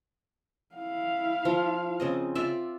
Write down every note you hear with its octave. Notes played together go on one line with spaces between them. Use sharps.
E4 F5
F3
C#3 C4 D#5
F4 D5 E5